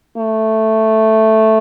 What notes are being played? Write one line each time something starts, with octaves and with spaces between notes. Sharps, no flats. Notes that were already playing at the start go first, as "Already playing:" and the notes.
A3